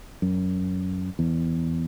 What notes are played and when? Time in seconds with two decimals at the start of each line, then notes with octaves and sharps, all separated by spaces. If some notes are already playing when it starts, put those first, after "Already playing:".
0.22 F#2
1.19 E2